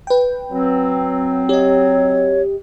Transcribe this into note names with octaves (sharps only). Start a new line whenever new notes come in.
B4 G5
F#3 C4
G4 C#5 D#5